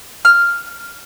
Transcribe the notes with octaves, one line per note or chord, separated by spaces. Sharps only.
F6